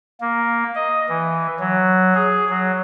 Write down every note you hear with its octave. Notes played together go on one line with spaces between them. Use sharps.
A#3
D#5
E3
F#3
G#4
F#3